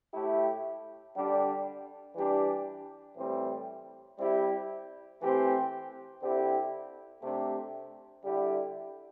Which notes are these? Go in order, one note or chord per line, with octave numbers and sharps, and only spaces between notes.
A2 A3 E4 G4
D3 G3 D4 G4
E3 G3 D4 G4
A2 E3 G3 C4
G3 C4 E4 G4
E3 A3 C4 G4
D3 C4 E4 G4
C3 A3 D4 G4
D3 G3 E4 G4